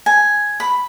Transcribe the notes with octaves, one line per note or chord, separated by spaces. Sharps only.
G#5
B5